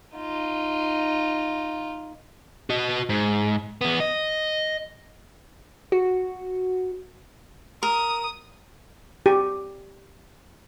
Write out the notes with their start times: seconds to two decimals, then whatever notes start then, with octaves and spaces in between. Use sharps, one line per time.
0.16 D#4 F4
2.70 F#4 D#5
3.09 G#2
3.81 E2 B3
4.00 D#5
5.92 F#4
7.83 A#4 D#6
9.26 G4